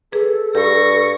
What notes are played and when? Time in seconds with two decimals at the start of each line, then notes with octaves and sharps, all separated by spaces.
0.12 G#4 A4 B4
0.55 G2 G4 C#6 A#6